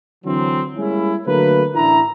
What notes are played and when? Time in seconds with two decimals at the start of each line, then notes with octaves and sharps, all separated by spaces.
0.24 D3 E3 F#3 C4
0.77 G3 G#3 A#3 C#4 E4
1.26 D3 F#3 A3 A#3 A#4 B4
1.74 A1 D4 E4 A#5